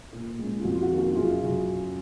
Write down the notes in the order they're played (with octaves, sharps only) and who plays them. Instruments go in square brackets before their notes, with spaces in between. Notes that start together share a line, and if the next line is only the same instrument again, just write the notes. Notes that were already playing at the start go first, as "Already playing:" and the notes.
[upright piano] A#2
G#3 C#4
F4
F2 F#4
F4
F#4
D#3 A#3 C#4
F#4
F#2 F4 G#4
C#3 F#3 C#4